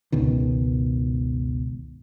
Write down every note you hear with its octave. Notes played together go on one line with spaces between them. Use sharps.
G1 C#2 B2 D#3